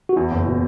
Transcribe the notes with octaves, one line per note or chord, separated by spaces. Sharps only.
F#4
E2 E4
F#1
B2